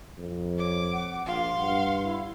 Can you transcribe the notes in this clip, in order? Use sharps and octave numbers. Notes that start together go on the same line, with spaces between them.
F2
C#5 D6
F#5
A#1 F4 F5 C6
G2 F#5
E4